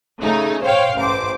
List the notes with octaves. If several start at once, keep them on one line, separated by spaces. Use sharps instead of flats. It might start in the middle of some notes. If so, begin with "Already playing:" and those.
C#3 A3 D#4
C5 C#5 F5 G5
A1 C5 D6